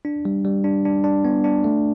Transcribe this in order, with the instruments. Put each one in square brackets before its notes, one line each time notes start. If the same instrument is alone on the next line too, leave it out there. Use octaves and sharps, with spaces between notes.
[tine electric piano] D4
G3
G3
D4
D4
D4
B3
D4
A3